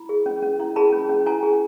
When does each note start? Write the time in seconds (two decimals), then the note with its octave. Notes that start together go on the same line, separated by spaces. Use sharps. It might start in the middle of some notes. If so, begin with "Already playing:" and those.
Already playing: E4 B5
0.09 G#4
0.26 C#4
0.42 C#4
0.60 E4
0.76 G#4 A5 B5
0.92 C#4
1.09 C#4
1.26 E4 G#5 A#5
1.43 G#4